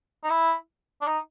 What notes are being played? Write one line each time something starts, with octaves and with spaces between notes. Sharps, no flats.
D#4
E4
D4
D#4